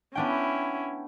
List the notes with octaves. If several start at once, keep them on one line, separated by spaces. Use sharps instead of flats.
B3 C#4 D4 E4 G5